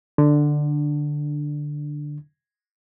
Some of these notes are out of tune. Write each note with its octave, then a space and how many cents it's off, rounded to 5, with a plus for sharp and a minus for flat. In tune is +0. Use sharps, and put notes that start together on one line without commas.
D3 +10 D4 +0